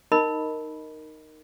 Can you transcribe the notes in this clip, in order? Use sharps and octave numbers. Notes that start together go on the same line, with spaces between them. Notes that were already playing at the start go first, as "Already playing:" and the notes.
D#4 A#4 D#5 B5